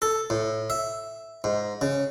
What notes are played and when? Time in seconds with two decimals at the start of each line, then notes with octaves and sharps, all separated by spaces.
0.02 A4
0.30 A2
0.70 E5
1.44 G#2
1.81 C#3